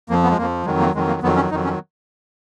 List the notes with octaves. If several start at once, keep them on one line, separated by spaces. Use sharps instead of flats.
F2 F3 A#3
B3
G#3
F2 F3 A#3
F2 D#3 F#3 G#3
A#3
F2 D#3 F#3 G#3
A#3
F2 D#3 F#3 B3
C#4
F2 D#3 F#3 D#4
C#4